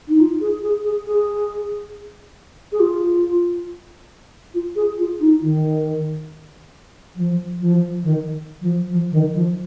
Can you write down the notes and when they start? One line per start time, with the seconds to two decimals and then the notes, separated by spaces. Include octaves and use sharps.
0.08 D#4
0.20 F4
0.41 G#4
0.63 G#4
0.84 G#4
1.07 G#4
2.72 G#4
2.80 F4
4.54 F4
4.76 G#4
4.99 F4
5.20 D#4
5.41 D#3
7.16 F3
7.59 F3
8.03 D#3
8.61 F3
8.90 F3
9.11 D#3
9.34 F3